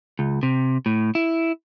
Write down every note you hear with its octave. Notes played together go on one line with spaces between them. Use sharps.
C#2
C3
A2
E4